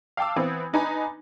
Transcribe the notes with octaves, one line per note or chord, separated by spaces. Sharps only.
F5 G5 A5 D6 E6
E3 B3 C4
D4 D#4 B4 G#5 A#5 B5